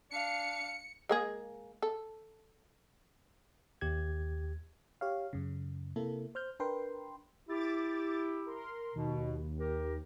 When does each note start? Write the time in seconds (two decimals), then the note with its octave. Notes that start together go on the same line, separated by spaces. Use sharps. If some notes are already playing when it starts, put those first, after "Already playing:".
0.11 D4 F5 C#7
1.09 G#3 A#3 G#4
1.82 A4
3.81 D#2 G4 G#6
5.01 G4 C#5 F5
5.33 F#2 C#3
5.96 C3 A#3 E4 A4
6.35 C5 F6 G6
6.60 D4 A#4 B4 G5 C6
7.49 E4 G4 D6 A6
8.46 A#4 C6
8.95 D#2 B2
9.59 G4 A#4